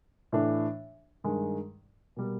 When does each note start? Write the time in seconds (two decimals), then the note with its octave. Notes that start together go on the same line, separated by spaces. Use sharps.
0.32 A2 E3 A3 D4
1.24 G2 D#3 G#3
2.16 B2 G3 A#3